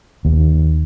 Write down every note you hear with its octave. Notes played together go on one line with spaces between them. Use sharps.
D#2